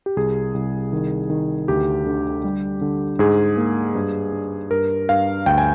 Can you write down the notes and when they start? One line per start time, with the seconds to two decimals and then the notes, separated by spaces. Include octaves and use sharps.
0.06 G4
0.17 C2 G#4
0.54 C2
0.93 D#3
1.30 D#3
1.68 D2 G4
2.07 D3
2.44 G3
2.81 D3
3.19 G#2 G#4
3.57 A#3
3.95 G2
4.33 D4
4.71 G2 A#4
5.09 G2 F5
5.46 D2 G5
5.58 G#5